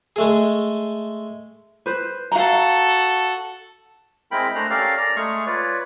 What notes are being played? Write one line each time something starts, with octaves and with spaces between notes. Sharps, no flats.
G#3 A3 G#4
B4 C5
F#4 A4 F5 A#5
G#3 C4 E4 A#4 G5 B5
A3 D4 C5 A#5 F#6
C#4 G4 A4 A#4 D5 F5
D5 A#5
G#3 A3 G#4 C#6 F6
F4 B4 C#5 D5